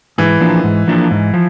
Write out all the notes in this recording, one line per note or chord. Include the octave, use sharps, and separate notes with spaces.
G#2 E3
F3 A#3 D4
G#2
F3 A#3 D4
G#2
F3